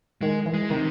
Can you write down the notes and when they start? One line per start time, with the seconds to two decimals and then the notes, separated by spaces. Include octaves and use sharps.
0.21 D#3 G#3
0.46 E3
0.54 G#3
0.70 C3 D#3